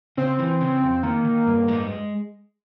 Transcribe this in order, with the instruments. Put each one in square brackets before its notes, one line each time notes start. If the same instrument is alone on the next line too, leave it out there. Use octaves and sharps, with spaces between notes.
[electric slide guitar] C#3 [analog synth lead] C4
[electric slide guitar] E3
C#3
F2
[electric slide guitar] D#3 [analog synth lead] A#3
[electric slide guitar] D#3
G2
G#3